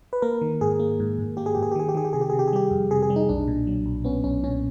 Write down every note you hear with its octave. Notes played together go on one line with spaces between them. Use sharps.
B4
A#3 A#4
D#3
G#2 G#4
A#3
G#2
G#2
A#3 G4
G#4
G#2 G4
G#4
G4
D#3 G#4
G4
D#3 G#4
G4
C3 G#4
G4
C3 G#4
G4
G#4
G3 G4
F2
C3 G#4
G#4
G3
D#4
B1 D4
A#2
F#3
B1
B3 C#4
B1 C#4
A#2 C#4